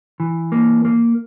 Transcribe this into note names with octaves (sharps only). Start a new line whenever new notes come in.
E3
A#3
A#3